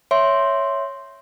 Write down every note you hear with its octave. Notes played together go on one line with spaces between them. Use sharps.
C#5 E5 C6